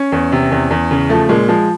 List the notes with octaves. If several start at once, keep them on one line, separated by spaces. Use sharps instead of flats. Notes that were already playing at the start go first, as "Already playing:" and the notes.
Already playing: C#4
E2
C3
E2
E2
C#3
F3 A3
A#2 G#3
F3 G#3